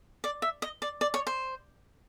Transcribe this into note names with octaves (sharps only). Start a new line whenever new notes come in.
D5
E5
D#5
D5
D5
C#5
C5